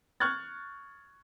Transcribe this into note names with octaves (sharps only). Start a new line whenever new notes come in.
C#6 F6 F#6 G#6 A6